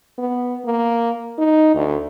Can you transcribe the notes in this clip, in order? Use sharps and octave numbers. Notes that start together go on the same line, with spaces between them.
B3
A#3
D#4
D2